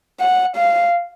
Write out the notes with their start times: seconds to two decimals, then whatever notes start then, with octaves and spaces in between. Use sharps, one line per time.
0.20 F#5
0.56 F5